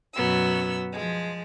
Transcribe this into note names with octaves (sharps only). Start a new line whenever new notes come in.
F#2 B2 F#3 B3 E6
F3 G#3